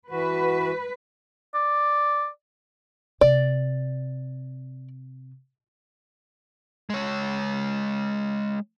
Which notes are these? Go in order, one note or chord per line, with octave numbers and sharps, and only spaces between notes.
E3 F#4 B4
D5
C3 D5
G#3 C#5